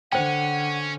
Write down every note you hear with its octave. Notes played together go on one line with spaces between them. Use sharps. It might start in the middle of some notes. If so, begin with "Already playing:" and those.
D3 C#4 C5 F#5 G5